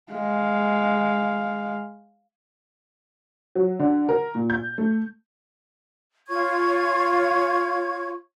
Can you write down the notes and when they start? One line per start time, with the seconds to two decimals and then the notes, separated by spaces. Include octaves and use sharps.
0.12 G#3 F5
3.55 F#3
3.80 D3
4.09 A#4
4.35 A#2
4.50 G6
4.78 A3
6.28 F4 C#5 C#6 G#6